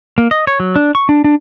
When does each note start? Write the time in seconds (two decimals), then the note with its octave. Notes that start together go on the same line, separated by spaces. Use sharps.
0.18 A#3
0.31 D#5
0.47 C#5
0.60 F#3
0.76 D4
0.95 C#6
1.09 D4
1.24 D4